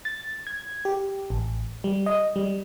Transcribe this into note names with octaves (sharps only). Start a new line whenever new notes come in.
A6
G#6
G4
A1
G3
D#5
G3